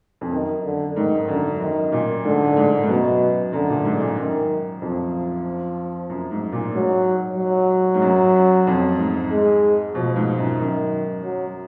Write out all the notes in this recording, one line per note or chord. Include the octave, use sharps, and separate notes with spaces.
F2
F#2 D#3
D3
G#2 D#3
F#2 D3
F#2 D#3
A#2
G#2 D3
G#2
G#2
F#2 B2
F#2 D3
A#2
G#2
A#2
F#2 D#3
F2 F3
F#2
G#2
A#2
G#2 F#3
F#3
G#2
F#2
F2
G#2
G#3
B2 F3
G#2
F#2
F#2 D#3
F#3